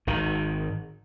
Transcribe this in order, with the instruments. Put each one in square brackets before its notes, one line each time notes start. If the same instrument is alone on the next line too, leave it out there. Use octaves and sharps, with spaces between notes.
[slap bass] G#1 D#3